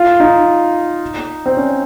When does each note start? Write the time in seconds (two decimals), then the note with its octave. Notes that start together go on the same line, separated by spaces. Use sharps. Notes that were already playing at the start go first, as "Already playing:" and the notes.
Already playing: F4
0.20 D#4
1.46 C4
1.57 C#4